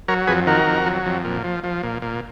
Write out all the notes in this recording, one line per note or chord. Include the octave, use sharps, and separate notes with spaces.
F#3 A#4 C#5
F2 G#4 B4
D#3 F#4 A#4
F2
F#3
F2
A#2
F3
F3
A#2
A#2